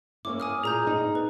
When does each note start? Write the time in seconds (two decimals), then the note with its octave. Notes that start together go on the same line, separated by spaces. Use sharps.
0.25 A#3 C#4 E4 D6
0.40 G#5 D#6 F6
0.63 A#2 G#4 A#5 G6
0.87 D#4
1.15 B4